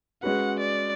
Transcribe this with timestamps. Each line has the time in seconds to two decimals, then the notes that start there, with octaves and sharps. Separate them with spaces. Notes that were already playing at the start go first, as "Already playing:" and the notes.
0.23 G#3 C#4 F#4 B4 F#5
0.60 D5